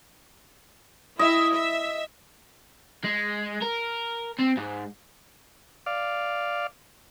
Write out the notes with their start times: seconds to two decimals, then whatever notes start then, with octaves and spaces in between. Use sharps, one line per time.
1.19 E4 D#5 E5
1.54 E5
3.04 G#3
3.62 A#4
4.39 C4
4.57 G#2
5.86 D5 F5